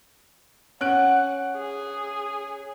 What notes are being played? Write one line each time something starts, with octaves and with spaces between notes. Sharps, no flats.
C#4 F#5 F#6 D7
G#4